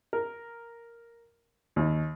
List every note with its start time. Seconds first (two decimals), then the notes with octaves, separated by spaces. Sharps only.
0.13 A#4
1.76 D#2